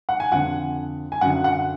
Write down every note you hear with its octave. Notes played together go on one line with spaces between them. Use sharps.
F#5
G#5
F2 D3 F#5
G#5
F#2 D3 F#5
F#5